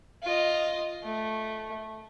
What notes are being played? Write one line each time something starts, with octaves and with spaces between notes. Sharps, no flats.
F4 D#5
A3